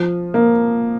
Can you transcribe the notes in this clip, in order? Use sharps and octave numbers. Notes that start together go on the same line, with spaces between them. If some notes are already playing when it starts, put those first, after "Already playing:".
Already playing: F3
A#3